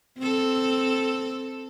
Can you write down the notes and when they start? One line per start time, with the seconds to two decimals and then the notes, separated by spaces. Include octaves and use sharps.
0.18 C4 A4